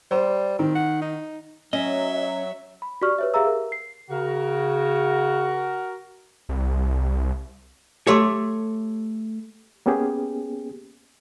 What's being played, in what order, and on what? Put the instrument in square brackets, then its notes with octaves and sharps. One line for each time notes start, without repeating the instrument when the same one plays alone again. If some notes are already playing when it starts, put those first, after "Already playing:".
[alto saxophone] G3 [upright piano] C5
[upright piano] D#3 [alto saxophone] C4
[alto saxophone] F#5
D#4
[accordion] F#3 [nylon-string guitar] C#4 [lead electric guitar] D#5 [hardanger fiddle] E5
[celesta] B5
F#4 G4 D5 C#6 F6
B4 C#5 E5
G4 G#4 E5 F5 A#5 E6
A#4
C7
[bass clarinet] C#3 [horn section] F#4 A#4
[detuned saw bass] C2
[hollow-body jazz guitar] A3 C#5 [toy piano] G4 C6 D6
[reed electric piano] A#3 B3 C#4 G4 G#4